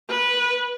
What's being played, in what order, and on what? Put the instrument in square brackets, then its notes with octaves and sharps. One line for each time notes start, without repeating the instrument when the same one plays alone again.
[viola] B4